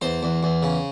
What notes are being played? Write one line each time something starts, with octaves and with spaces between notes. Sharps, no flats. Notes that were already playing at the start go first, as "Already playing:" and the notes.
E2 C5
E2
E2
C#3